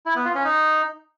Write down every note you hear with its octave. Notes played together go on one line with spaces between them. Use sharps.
E4
B3
F4
C#4
D#4